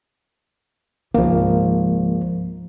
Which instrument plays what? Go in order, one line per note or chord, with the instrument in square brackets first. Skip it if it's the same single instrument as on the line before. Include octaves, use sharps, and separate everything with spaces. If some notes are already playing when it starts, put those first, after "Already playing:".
[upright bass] C#2 G#2 [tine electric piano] F3 A#3